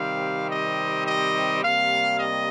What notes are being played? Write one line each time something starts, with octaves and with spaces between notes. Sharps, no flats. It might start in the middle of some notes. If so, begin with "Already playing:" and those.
Already playing: C3 D#3 G3 C4 F5
D#5
D#5
C3 G3 A#3 F5
D#5